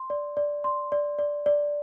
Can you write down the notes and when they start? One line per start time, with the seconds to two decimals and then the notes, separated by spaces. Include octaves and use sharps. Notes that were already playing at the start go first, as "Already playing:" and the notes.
Already playing: C6
0.10 D5
0.37 D5
0.64 C6
0.92 D5
1.19 D5
1.46 D5